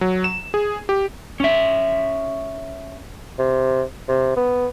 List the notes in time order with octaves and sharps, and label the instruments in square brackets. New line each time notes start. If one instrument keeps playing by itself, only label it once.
[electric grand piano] F#3
E7
G#4
G4
[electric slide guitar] C#4 E5
[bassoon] C3
C3
B3